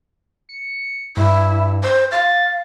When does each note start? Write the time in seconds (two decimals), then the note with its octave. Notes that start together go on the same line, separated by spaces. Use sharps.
0.49 C#7
1.17 G2 E4
1.83 C5
2.12 F5 A6